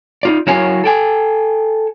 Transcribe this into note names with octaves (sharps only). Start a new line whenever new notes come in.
D#4 F4 D5
F#3 E4 A#4 C#5 F5 G#5
A4 G5 G#5